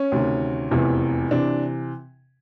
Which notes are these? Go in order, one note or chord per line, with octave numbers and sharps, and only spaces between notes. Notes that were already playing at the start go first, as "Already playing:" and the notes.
Already playing: C#4
D2 C3 D#3
F1 E2 C3 E3
C3 E3 D4